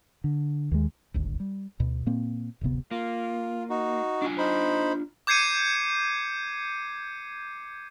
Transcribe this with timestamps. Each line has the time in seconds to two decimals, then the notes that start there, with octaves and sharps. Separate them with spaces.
0.24 D3
0.72 D#2 G#3
1.14 D#1 G#1 D2
1.40 G3
1.80 D2 B2
2.06 A#2 A#3 C4
2.61 D1 G1 C3 B3
2.91 A#3 F4
3.70 D#4 F#4
4.22 D4 F4 G#5
4.38 D#4 C5 B5
5.27 D6 G6 G#6 C7 C#7 D#7